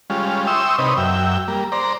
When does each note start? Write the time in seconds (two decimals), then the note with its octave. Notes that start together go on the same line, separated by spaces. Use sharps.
0.10 G3 G#3 C#4 F4
0.47 E5 G5 C6 C#6 D#6 E6
0.78 C3 C4 D#4 B4 C#5 D#5
0.97 F#2 E5 G5
1.48 G3 A#3
1.72 C5 D5 A#5